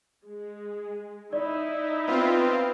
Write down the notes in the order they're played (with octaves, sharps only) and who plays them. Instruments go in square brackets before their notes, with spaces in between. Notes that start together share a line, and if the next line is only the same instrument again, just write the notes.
[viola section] G#3
[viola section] D#4 E4 E5 [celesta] D5
[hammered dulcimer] B3 G4 C5 [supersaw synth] C4 F4